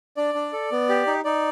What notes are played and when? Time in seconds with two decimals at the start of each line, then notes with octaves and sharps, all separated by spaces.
0.17 D4 D5
0.35 D4
0.53 A4
0.72 B3
0.89 G4
1.07 D#4
1.25 D#4 D5